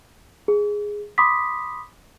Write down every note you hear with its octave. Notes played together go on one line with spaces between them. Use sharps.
G#4
B5 C6 D6 D#6 B6